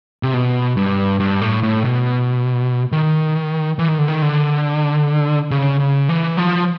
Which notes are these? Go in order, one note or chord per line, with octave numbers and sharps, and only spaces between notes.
C3
B2
G2
G2
A2
A2
B2
D#3
E3
D#3
D3
D#3
D3
C#3
C#3
E3
F3